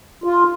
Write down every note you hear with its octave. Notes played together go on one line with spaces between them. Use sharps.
F4